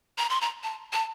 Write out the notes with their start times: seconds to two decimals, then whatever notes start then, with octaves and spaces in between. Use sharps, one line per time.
0.18 A#5
0.30 C6
0.41 A#5
0.63 A5
0.93 A5